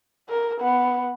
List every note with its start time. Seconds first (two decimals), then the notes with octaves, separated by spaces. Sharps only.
0.29 A#4
0.61 B3